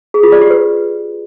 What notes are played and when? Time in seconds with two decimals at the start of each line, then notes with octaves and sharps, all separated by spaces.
0.14 G#4
0.23 F4
0.32 D5
0.41 G4
0.50 B4